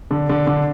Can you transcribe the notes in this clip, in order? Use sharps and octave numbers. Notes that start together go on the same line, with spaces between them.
D3
D3
D3